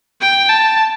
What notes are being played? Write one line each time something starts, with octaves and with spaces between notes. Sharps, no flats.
G5
A5